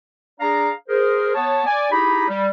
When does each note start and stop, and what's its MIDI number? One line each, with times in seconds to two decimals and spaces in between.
0.40 0.70 62
0.40 0.70 68
0.40 0.70 74
0.40 0.70 77
0.40 0.70 82
0.89 1.33 68
0.89 1.33 70
0.89 1.33 72
1.34 1.63 59
1.34 1.63 73
1.34 1.63 81
1.66 1.88 74
1.66 1.88 80
1.91 2.26 63
1.91 2.26 64
1.91 2.26 67
1.91 2.26 68
1.91 2.26 82
1.91 2.26 83
2.28 2.48 55